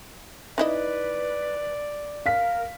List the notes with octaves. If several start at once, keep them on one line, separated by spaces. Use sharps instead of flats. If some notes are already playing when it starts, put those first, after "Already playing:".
D#4 E4 B4 D5 D#5
A#4 F5 B6